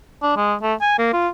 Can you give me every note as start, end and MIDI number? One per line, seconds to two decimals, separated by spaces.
0.23 0.33 62
0.37 0.54 56
0.62 0.74 57
0.81 0.96 80
0.99 1.10 58
1.13 1.28 65